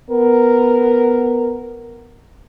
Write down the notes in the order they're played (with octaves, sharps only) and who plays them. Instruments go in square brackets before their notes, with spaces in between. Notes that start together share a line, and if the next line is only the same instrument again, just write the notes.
[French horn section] B3 A#4